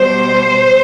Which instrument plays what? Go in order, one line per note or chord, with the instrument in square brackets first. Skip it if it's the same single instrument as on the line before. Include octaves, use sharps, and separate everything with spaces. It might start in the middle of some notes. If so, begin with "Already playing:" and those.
Already playing: [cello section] B2 G3 C5